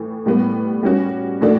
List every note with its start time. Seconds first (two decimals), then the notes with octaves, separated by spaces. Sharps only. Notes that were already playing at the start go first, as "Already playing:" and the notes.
Already playing: A2 E3 A3
0.26 A2 G3 B3
0.83 G3 C#4 F#4
1.41 A2 E3 A3 D4 F#4